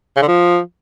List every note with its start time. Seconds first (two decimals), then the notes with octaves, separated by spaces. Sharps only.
0.16 C#3
0.22 D3
0.28 F3